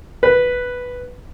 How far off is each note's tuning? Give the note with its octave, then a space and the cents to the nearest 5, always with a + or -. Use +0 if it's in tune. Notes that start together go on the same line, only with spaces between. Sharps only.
B4 +0